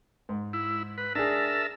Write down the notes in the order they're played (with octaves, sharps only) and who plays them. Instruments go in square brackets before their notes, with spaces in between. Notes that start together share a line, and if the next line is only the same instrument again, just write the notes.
[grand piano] G#2
[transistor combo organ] E4
B4
[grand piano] D4 G#4 [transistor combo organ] A#4 E5 A5